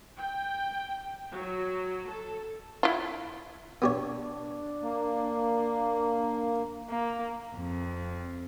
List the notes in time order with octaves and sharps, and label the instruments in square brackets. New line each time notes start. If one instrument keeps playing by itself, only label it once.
[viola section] G5
F#3
A4
[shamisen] E4 F4
[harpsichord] B3 G4 C#5 [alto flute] D4
[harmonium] A#3
[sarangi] A#3
[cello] F2